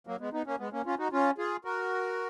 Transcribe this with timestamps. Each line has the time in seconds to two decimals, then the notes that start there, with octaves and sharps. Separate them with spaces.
0.07 F#3 A#3
0.20 G#3 B3
0.33 B3 D#4
0.47 A#3 C#4
0.59 G#3 B3
0.73 A#3 C#4
0.86 C#4 F4
0.99 D#4 F#4
1.12 C#4 F4
1.38 F4 G#4
1.65 F#4 A#4